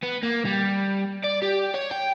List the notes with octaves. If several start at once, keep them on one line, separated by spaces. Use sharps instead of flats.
B3
A#3
G3
D5
G4
C#5
G5